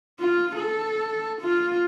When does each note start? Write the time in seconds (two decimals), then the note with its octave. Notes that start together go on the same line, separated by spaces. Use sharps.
0.19 F4
0.56 A4
1.41 F4